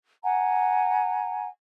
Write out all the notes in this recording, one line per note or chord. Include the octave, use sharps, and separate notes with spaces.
F#5 G#5 A#5